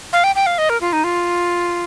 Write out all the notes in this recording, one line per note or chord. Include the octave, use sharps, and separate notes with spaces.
F5
G5
G5
F5
D#5
A#4
F4
D#4
F4